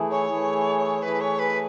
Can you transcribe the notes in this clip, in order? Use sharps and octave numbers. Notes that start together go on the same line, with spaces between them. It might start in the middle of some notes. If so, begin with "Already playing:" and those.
Already playing: E3 A3 E4 G#4
C#5
E3 A3 E4 G#4
E3 A3 E4 G#4 B4
C#5
B4